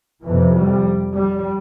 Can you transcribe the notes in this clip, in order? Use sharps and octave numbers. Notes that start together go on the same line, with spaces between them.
F2 C3 E3
G3
G3